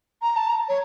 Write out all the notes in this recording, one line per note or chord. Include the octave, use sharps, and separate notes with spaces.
A#5
A5
A#5
C#5